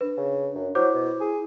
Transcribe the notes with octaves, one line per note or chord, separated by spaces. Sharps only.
D4 B4
C#3
F#2
F#3 E4 C5 D6 G6
B2
G#4